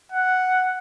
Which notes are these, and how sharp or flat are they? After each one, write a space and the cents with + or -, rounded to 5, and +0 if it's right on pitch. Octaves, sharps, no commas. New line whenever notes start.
F#5 +0